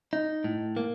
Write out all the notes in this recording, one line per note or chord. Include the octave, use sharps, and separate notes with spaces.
D#4
A2
A#3